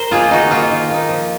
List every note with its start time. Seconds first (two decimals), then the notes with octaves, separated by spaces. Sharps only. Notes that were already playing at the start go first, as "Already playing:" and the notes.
Already playing: A#4 C5
0.11 F3 A#3 D#4 F4 G#4
0.29 D#3 D#4 F#4
0.50 A#3 D#4 F4
0.70 D#3
0.90 A#3 D#4
1.09 F3